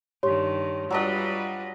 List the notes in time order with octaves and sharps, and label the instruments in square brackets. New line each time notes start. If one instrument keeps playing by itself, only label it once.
[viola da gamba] G2 D#3 [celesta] G4 C6 [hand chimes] C#5
[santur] F#3 D4 D#5 [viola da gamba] G3 F4 B4